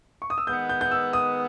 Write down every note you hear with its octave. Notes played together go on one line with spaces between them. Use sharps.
C#6
D#6
E6
D#3 G#3 B3 G6
G6
G6
E6
D#6